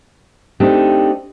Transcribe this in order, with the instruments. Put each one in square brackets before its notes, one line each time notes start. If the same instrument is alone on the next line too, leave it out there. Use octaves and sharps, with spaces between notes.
[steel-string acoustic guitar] A3 C4 D4 D#4 G4